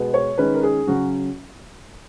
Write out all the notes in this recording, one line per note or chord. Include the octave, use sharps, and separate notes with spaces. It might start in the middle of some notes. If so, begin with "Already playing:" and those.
Already playing: B2 G#3 B3
C#5
D#3 G#3 C#4 B4
A#4
G#4
C#3 F#3 C#4 F#4